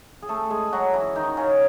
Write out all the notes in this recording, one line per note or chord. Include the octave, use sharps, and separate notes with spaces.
G#4
A3 A4
G#3 G#4
F#3 F#4
E3 E4
D#3 D#4
C#3 C#4